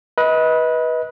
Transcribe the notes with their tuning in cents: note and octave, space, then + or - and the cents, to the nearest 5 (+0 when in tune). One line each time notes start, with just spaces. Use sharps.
B4 -15 D#5 +30